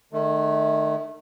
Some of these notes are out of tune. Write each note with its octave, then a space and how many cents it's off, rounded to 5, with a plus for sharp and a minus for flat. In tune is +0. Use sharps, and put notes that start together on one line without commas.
D#3 -40 A3 -25